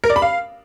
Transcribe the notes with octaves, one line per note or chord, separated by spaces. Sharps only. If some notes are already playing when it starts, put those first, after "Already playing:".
A#4
D5
B5
F5